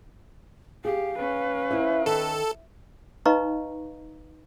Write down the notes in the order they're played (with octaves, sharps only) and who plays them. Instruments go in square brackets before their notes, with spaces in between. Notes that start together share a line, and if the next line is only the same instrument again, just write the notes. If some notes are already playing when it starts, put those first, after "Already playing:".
[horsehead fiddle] G4 [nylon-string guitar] G#4 [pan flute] F5
[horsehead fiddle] C#4 B4
[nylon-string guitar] E4 C5 E5
[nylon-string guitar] D#3 [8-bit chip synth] A4
[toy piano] D#4 B4 D#5 F5 A#5 C#6